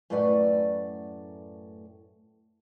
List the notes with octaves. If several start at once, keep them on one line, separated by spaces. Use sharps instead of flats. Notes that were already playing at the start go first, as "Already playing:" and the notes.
F#2 A2 A3 B4 D5 F#5